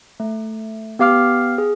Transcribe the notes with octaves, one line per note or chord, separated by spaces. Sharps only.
A3
B3 G4 F5 D6 F6
G#4